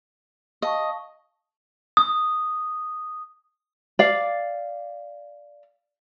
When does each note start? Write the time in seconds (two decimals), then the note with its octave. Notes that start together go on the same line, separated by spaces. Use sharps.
0.62 D#5 F5 A5 C#6
1.97 D#6
3.99 D5 F5